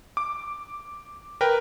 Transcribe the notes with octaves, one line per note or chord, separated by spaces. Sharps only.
D6
A#4 B4 G5